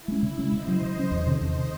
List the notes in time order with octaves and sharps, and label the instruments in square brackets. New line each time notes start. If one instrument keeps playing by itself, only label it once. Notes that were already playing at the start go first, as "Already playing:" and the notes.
Already playing: [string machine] E4
[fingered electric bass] G#3 C#4
C#3
G#3 C#4
[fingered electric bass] C#3 [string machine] C5 D#5
[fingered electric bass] F#3 C#4
C#3
F#3 C#4
[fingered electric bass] E2 [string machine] A4 C#5
[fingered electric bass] C3 D#3
[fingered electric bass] E2 [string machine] C5 D#5
[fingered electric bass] C3 D#3